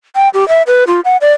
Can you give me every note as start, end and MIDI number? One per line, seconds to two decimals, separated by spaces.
0.16 0.29 79
0.34 0.47 67
0.48 0.62 76
0.67 0.84 71
0.87 1.00 65
1.05 1.17 78
1.21 1.31 74